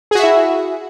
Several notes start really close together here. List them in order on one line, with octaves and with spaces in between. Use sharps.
G#4 F#4 E5 E4